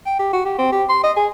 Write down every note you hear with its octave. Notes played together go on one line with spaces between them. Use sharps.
G5
G4
F#4
G4
C4
G4
C6
D#5
G#4